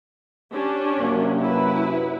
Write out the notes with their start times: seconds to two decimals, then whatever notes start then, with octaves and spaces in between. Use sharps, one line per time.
0.52 C#4 D4 G4
1.00 F#2 C3 A#3
1.42 E4 B4